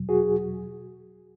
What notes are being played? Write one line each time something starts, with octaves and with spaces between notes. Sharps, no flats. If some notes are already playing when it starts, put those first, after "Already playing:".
Already playing: E2 B2 F#3
F#4 G#4